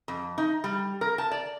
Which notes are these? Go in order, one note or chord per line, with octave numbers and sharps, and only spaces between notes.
F2
D#4
G3
A#4
A5
D5